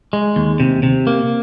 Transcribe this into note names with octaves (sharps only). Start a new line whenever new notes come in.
G#3
D#2
C3
C3
A#3